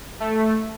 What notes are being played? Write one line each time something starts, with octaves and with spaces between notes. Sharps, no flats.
A3